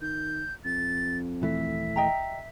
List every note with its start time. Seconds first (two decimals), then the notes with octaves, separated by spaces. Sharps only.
0.01 D#3 G6
0.65 F2 A6
1.42 D#1 E3 A3 E5
1.96 D#5 G5 A#5